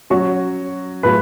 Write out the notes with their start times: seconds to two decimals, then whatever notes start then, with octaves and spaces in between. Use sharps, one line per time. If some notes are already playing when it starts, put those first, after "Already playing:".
0.10 F#3 C#4 F#4 C#5 C#6
1.03 A2 F#3 A3 F4 G#4 B4 B5